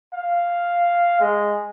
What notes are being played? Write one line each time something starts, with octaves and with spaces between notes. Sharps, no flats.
F5
G#3